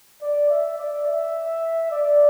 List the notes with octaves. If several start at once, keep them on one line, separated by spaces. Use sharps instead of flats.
D5
E5
D5
E5
D5